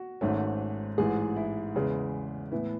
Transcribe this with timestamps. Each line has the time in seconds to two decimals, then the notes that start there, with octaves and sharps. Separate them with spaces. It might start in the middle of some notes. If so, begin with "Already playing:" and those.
Already playing: F#4
0.21 G#1 G#2 D#3 A3 C#4
0.98 A1 G#2 E3 G#4
1.36 E4
1.75 E2 C#3 G#3 B3
2.51 A2 E3 B3 E4